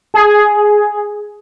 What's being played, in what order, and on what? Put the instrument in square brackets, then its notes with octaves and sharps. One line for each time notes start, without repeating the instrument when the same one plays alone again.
[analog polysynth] G#4